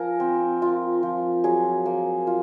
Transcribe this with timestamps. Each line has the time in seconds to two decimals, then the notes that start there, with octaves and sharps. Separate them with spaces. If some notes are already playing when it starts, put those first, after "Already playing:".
Already playing: F3 A#4 G#5 A#5
0.20 C4
0.62 F4
1.03 F3
1.44 F#3 G#4 G#5
1.86 A#3
2.27 F4